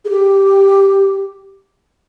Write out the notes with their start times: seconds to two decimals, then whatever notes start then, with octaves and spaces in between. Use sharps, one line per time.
0.05 G#4
0.09 G4